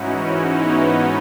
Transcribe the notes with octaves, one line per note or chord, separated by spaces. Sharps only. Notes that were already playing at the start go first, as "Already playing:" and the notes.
Already playing: G#2 E3 C#4 D#4 E4 F#4
C#4 E4
B3 D#4